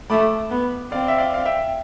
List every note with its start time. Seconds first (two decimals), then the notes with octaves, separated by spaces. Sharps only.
0.10 A3 B5 D6
0.50 B3
0.91 C4 D5 F5
1.08 E5
1.18 D5 F5
1.34 F5
1.45 E5 G5